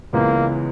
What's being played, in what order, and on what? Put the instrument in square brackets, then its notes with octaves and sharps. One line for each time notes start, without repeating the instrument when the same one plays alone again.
[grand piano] C#2 C#3 E3 G#3 B3 [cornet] A#3